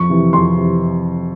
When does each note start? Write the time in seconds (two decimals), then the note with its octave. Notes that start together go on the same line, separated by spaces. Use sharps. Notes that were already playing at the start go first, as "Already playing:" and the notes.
Already playing: F2 C#6
0.09 C3 E3
0.33 F2 C6
0.57 C3 E3